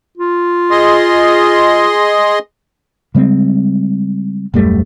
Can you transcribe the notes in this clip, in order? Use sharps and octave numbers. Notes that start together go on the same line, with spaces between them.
F4
G#4 D#5 C6
C#3 G3 G#3 C4
D#1 F#2 G3 A3